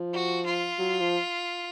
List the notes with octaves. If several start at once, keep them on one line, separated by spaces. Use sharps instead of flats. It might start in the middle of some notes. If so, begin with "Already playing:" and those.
Already playing: F3
F#4
F4
F#3
F3